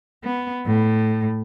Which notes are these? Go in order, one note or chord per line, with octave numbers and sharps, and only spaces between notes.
B3
A2